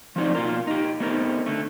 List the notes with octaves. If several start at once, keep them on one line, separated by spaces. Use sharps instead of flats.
F3 F#3 C4 D#4 D5
B2 A#3 F4 A#4
D#4 G4
A3 B3 C4 D#4 A#4
D3 A3